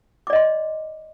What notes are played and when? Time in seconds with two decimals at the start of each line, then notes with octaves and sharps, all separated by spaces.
0.27 D6
0.30 D5
0.33 D#5
0.36 C6